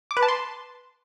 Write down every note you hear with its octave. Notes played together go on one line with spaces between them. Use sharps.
D6
B4
A5
C6